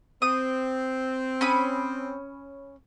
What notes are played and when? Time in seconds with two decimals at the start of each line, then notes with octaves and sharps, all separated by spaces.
0.22 C4 D#6
1.41 C#4 B5 D#6